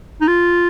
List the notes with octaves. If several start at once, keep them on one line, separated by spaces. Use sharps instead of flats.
D#4
F4